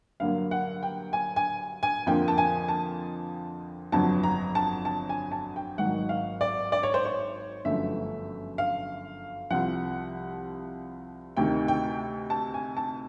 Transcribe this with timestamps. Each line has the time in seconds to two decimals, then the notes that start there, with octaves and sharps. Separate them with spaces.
0.20 G2 D3 F#3 A#3 F5
0.51 F#5
0.83 G5
1.13 G#5
1.36 G#5
1.83 G#5
2.06 F2 D3 F3 A#3 G5
2.28 A5
2.38 G#5
2.68 A5
3.92 G1 F2 D3 F#3 A5
4.24 A#5
4.55 A5
4.85 A5
5.09 G#5
5.32 A5
5.56 G5
5.78 G#1 G#2 D#3 F#3 F#5
6.09 F5
6.41 D5
6.72 D5
6.83 C#5
6.94 C5
7.05 C#5
7.65 G1 F#2 D3 F3 A3 E5
8.58 F5
9.51 C2 C3 F3 F#5
11.37 D2 C3 D#3 G5
11.68 G5
12.30 A5
12.54 G#5
12.77 A5